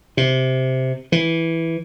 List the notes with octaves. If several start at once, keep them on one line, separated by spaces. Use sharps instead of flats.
C3
E3